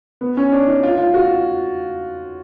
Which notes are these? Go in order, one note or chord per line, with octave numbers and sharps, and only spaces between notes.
B3
C#4
D4
D#4
F4
F4
F#4